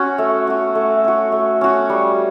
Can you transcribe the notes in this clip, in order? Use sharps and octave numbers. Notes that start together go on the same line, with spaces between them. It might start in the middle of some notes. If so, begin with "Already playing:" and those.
Already playing: C#4 F#4
A3
C#4 F#4
A3
C#4 F#4
A3
C#4 F#4
G3